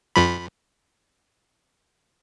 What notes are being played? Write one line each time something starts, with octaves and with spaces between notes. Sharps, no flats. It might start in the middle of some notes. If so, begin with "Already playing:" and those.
F2 F3 B5